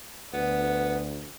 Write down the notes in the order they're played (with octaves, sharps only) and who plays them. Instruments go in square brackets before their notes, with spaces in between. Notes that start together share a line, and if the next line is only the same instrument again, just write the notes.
[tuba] D2 [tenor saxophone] B3